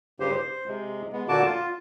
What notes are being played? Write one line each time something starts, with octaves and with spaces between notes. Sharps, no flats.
G2 C#3 G4 C5
C5
C3 G#3
G#3 B3
A#2 D3 A#3 F#4 A5 D6
F4